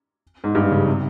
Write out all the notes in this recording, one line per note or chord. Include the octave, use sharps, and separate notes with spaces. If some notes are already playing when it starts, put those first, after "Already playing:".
G#2
G2
C#3
C3